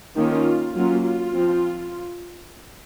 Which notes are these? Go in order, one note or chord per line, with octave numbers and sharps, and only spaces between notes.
D#3 A#3 C#4 F4
F#3 A#3 C#4 F4
F4
F3 C4